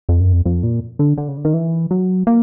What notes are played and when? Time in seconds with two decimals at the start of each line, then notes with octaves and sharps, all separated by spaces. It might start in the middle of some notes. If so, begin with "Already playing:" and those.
0.09 F2
0.20 F#2
0.32 F2
0.46 F2
0.63 A#2
0.99 D3
1.18 D3
1.28 C#3
1.37 D3
1.45 D#3
1.54 E3
1.91 F#3
2.27 A#3